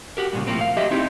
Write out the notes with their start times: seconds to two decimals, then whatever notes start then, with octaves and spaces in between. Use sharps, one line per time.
0.17 F#4 G4 A#4
0.33 G2 A#2 C#3
0.47 A2 F3 A#3 C4
0.61 F5
0.77 F#3 G4 D#5 E5
0.91 C4 D#4 E4 G4